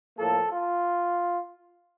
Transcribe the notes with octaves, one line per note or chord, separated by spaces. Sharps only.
A2 F3 A#3 A4
F4